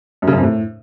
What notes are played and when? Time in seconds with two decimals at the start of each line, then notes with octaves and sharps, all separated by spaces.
0.22 F#2
0.27 C#3
0.32 F#2
0.38 F2
0.43 A2